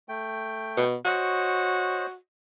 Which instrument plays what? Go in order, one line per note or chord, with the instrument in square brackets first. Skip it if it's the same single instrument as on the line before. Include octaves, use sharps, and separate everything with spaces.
[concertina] A3 G5
[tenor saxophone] B2
[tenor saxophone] F#4 [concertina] C5 C#5 D#5